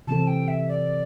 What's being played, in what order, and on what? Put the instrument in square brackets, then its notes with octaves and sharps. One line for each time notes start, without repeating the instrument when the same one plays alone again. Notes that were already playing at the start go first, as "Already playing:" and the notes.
[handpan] C3 E3 C4 A4 [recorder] A5
[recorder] G5
E5
D5